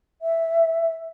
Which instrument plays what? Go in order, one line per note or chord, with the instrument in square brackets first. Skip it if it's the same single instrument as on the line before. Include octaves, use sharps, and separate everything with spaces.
[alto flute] E5